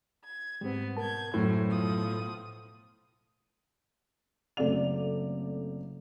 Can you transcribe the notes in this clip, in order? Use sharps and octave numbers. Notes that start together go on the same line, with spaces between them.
G#6
G#2 G3 G#3 B3 C4
B2 A#4 A5 G6 G#6
F#2 A2 F#3 A3 C#4 C5
B2 F3 D#6
F#1 A3 C4 D5 F7